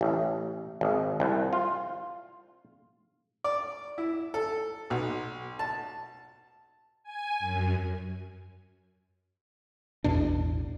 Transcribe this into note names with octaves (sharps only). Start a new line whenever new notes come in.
A1
G#1
C2
F4
D5
E4
A4
B1
A5
G#5
F#2
A1 E2 B2 D4